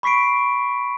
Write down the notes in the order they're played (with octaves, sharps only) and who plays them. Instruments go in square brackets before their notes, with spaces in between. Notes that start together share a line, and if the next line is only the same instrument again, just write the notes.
[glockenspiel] B5 C#6 B6 C7 D7